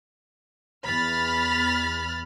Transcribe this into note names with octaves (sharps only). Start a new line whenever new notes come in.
E2 B5 F6 A6